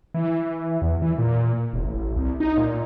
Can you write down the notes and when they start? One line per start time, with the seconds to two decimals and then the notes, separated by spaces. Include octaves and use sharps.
0.14 E3
0.82 E2
1.02 E3
1.18 A#2
1.73 E1
1.85 A1
2.16 C2
2.40 D#4
2.57 A#2